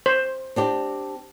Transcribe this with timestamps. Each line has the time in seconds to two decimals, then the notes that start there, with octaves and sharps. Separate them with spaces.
0.06 C5
0.56 C4 D4 G4